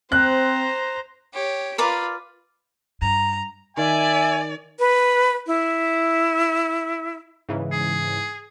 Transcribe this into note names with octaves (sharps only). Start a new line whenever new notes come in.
C4 C5 A#5 F#6
G4 C#5
F4 A#4 B4 D5 F5
G2 A#5
D#3 D5 E5 G#5
B4
E4
G#2 C#3 E3
G#4